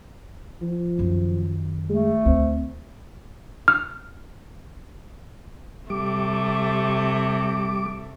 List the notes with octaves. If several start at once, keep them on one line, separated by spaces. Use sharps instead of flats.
F3
F#2 D#3
G#3 A3
D2 C4
F6
C3 G3 A3 D6